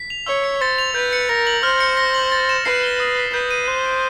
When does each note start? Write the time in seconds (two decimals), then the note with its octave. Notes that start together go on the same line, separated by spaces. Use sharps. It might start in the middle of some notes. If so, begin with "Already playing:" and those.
Already playing: B6
0.10 F7
0.26 C#5 E6
0.44 C#7
0.61 C5 A6
0.78 F7
0.95 B4 G6
1.13 C#7
1.29 A#4 A#6
1.47 F#7
1.63 C5 F6
1.80 C#7
1.97 A#6
2.14 F#7
2.32 A6
2.49 E7
2.65 B4 C7
2.83 G7
3.00 D#6
3.17 B6
3.34 B4 G6
3.51 D#7
3.68 C5 F#6
3.86 D7